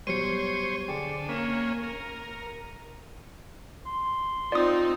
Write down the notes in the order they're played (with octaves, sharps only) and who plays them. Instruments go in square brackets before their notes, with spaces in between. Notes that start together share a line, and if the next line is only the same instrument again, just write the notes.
[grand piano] B2 F#3 G3 [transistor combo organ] C5 C#5 [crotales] C#7 D#7
[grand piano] D3 G#4 G5 [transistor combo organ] D4
[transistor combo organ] A#3 C#4 [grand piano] B6 E7
[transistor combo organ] A#4
[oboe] C6
[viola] C4 D#4 [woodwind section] F4 [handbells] D5 D#6